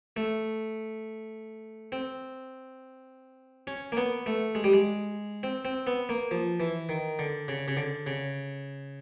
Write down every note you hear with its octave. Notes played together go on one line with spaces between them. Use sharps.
A3
C4
C#4
A#3
B3
A3
G#3
G3
G#3
C4
C4
B3
A#3
F3
E3
D#3
D3
C#3
C#3
D3
C#3